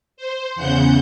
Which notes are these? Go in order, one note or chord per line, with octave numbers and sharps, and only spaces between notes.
C5
E2 C#3 F#5 G6